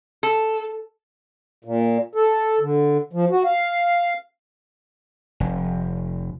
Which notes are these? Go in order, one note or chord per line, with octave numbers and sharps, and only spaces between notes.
A4
A#2
A4
D3
F3
F#4
F5
F1